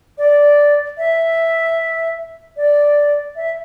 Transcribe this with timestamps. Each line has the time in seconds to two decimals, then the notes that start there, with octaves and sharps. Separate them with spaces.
0.18 D5
0.98 E5
2.57 D5
3.36 E5